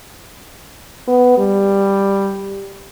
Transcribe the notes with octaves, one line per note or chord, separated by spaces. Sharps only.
B3
G3